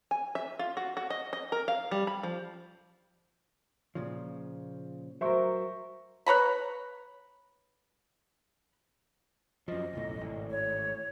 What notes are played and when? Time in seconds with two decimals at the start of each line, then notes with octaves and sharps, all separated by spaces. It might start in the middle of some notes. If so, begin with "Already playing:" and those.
0.11 G#5
0.35 E5
0.59 F4
0.77 F#4
0.97 F#4
1.10 D#5
1.33 D#5
1.52 A#4
1.68 F5
1.91 G3
2.07 B5
2.23 F3
3.95 A#2 C#3 F3
5.21 F#3 A#4 C5 E5 C#6
6.26 B4 C#5 A#5 B5
9.68 F#2 F3 D#5
9.93 F#1 B1 A2
10.21 G#1 A2
10.51 C#5